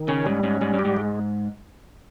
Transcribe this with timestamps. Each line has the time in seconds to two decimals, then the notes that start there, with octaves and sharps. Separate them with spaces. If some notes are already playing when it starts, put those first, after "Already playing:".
Already playing: D#3
0.08 C#3 C#4
0.26 G#2 G3
0.43 G#2 C#4
0.61 G#2 G3
0.74 G2
0.79 G4
0.85 G#2
0.97 G#3